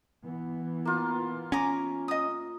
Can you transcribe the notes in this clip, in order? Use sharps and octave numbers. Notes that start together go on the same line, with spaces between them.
E3 B3
A#3 F4
C#4 G#5 A#5 D6
D#5 D#6